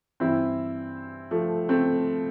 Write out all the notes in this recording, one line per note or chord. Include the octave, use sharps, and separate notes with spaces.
G2 E3 C4 E4
F3 A3
A3 C4